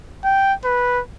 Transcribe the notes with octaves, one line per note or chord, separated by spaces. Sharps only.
G5
B4